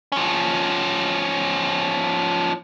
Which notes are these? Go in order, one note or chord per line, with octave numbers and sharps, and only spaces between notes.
F3 C#4